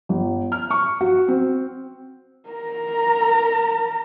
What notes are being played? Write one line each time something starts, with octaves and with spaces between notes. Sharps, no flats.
G1
F6
C#6
F#4
C4
A#4 A#5